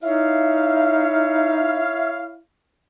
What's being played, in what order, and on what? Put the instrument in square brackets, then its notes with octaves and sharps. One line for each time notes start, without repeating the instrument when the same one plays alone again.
[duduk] D#4 [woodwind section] E4 C#5 F5 [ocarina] E5